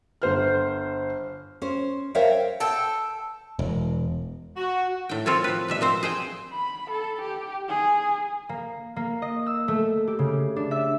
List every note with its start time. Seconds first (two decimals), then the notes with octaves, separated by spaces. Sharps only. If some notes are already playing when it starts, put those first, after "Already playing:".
0.22 G1 C5 F6
1.62 C#4 C5
2.15 A#4 C5 C#5 E5 F5 G5
2.60 A4 G5
3.59 E1
4.57 F#4
5.09 A2 G5
5.26 C4 F4 A4 C#5
5.44 F3 B4
5.68 B2 G3 E5
5.81 F3 C4 C5
6.03 G#4 C5 G5
6.53 B5
6.90 A4
7.21 G4
7.68 G#4
8.49 A#3
8.96 A#3
9.22 D#5
9.46 E6
9.68 A3
10.07 G4
10.19 C#3
10.56 D4
10.71 E5